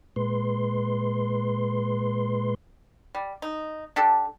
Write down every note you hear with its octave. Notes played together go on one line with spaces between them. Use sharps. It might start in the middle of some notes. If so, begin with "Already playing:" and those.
A#2 G#3 B4 C6
G3
D#4
D4 G4 A4